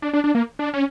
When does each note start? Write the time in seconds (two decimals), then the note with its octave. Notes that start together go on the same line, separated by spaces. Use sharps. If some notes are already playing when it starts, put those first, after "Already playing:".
0.02 D4
0.13 D4
0.24 D4
0.35 A#3
0.59 D4
0.74 C#4